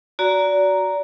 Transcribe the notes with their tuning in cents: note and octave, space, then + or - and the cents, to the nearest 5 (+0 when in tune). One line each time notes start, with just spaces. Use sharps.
F#4 +0 D5 -25 A#5 +0